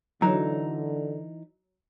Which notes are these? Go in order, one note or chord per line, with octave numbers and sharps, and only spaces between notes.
D3 E3 F#3 D#4 A#5